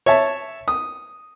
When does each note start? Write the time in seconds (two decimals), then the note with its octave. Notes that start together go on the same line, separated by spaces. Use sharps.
0.06 C#5 E5 A5
0.68 D#6